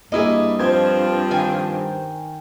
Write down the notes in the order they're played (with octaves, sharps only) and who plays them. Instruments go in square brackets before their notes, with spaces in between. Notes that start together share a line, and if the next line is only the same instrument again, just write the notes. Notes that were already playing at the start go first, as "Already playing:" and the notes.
[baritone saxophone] G2 [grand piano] A#3 E4 G#4 [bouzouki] D#5
[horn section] F3 C4 [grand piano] C5 G#6
[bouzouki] D#3 G#5